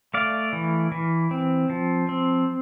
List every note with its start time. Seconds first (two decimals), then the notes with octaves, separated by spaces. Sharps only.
0.14 A3 D5 F5
0.53 E3
0.92 E3
1.31 C4
1.70 F3
2.09 C4